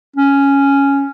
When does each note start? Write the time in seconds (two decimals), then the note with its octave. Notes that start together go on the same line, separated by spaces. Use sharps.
0.16 C#4